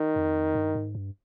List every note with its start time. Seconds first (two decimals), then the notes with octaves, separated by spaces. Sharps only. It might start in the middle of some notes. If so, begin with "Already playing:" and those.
Already playing: D#3
0.16 F2
0.55 G2
0.75 G#2
0.95 G2